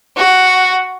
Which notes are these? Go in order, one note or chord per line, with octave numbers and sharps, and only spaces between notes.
F#4